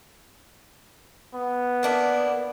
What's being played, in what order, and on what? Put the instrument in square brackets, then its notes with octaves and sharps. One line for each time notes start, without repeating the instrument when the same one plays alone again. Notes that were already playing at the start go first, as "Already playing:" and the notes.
[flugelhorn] B3
[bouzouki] A#3 D4 E4